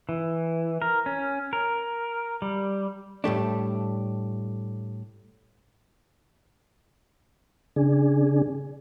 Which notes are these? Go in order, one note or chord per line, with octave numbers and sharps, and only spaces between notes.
E3
A#4
C#4
A#4
G3
A2 G3 A3 D4
C#3 D4 G#4